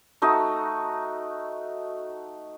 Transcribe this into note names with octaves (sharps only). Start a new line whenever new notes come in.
A3 D#4 F#4 D#5